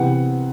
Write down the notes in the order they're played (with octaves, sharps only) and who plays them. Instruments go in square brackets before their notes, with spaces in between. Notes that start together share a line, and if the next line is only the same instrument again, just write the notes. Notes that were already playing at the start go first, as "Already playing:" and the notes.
Already playing: [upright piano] C3 E3 B3 F#5